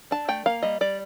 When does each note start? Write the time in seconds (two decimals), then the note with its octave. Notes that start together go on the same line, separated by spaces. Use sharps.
0.11 D4 A5
0.28 A3 G5
0.46 A#3 F5
0.63 G3 D#5
0.81 G3 D5